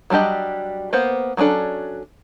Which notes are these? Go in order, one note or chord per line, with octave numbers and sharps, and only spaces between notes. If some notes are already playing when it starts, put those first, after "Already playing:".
F#3 G3 D4 G4 D#5
A#3 B3 C5 F#5
F#3 G#3 C#4 D4 A4